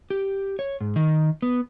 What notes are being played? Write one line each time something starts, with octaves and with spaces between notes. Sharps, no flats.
G4
C#5
G#2
D#3
B3